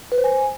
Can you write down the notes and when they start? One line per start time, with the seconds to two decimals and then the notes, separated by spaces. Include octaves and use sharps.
0.12 B4
0.18 C5
0.24 G#5